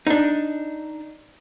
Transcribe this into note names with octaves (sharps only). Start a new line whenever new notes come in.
D4 D#4